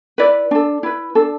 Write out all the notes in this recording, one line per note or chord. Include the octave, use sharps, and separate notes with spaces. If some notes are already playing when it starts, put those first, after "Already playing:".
E4 B4 D5
D4 A4
E4 B4
D4 A4